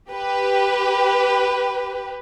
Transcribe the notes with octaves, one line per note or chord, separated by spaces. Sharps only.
G4 B4